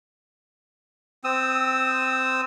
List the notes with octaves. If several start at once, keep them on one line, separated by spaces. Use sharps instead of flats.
C4 D#6 E6